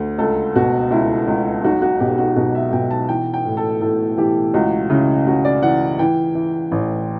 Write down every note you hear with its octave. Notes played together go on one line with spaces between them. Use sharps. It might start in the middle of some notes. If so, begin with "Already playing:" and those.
Already playing: D2
C#2 A4
B2 F#4
C#2 E4
C#2
B1 F#4
F#4
B2 G4
F#4
B2 F#4
E5
B2 G5
A5
E3 G5
G5
A2
A4
A2 A4
E3 G4
C#2 F#4
C#3 E4
C#2 F#4
D5
E3 F#5
E3 G5
E3
A1